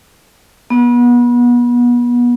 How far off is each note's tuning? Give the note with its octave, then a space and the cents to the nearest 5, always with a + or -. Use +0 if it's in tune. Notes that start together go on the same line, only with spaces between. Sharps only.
B3 -30